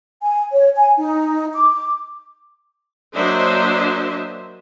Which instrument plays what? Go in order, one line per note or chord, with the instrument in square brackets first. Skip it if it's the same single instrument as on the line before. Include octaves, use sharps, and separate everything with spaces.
[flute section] G#5
C#5
G#5
D#4
D6
[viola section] F#3 A#3 D4 C5 D#5 E5